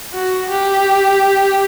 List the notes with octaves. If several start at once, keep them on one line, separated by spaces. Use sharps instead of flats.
F#4
G4